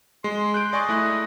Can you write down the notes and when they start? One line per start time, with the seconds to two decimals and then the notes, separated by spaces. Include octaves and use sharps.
0.24 G#3 C6
0.54 F#6 G6 D7
0.73 D5 D#5 G#5 C#6
0.89 A3 E4 F#6